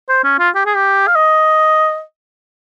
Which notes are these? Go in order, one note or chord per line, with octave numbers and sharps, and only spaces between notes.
C5
C#4
F4
G4
G#4
G4
F5
D#5